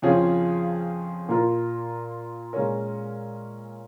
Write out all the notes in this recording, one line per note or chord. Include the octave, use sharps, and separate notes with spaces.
F2 C#3 F3 C#4 G#4
A#2 A#3 F4 A#4
A#2 G#3 C#4 A#4